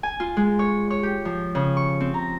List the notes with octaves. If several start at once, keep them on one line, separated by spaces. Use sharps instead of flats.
G#5
F4
G#3
C#5
C#5
G4
F3
C#3
C#6
C4
A#5